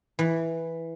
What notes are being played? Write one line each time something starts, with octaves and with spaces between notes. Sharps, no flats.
E3